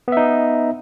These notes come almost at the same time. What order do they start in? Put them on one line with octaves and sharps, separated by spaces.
B3 E5 D#4